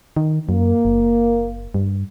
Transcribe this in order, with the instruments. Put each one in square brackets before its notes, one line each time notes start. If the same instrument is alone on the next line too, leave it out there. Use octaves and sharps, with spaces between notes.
[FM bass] D#3
[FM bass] F#2 [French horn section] A#3
[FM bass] F#1
G2